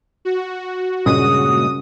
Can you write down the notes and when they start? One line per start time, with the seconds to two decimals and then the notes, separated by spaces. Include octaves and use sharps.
0.25 F#4
1.06 G2 A#2 C#3 G#3 D#6